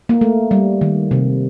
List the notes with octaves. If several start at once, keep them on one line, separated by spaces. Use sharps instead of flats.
A#3
A3
G3
D#3
C3